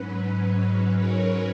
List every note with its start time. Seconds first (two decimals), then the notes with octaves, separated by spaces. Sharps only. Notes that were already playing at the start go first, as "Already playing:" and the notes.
Already playing: G#2 F#3 C#4 B4
0.21 B4
0.59 B4
0.96 A#4 C#5